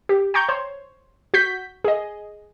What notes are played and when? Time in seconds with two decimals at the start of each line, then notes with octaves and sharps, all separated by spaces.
0.09 G4
0.34 G5 A#5 C#6 G6
0.48 C5 C#5
1.34 F#4 G6 B6
1.84 G#4 D#5